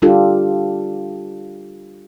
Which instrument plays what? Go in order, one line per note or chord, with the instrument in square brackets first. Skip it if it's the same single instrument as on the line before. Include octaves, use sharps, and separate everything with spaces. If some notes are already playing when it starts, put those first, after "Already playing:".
[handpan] G3 D4 F4 G4 A4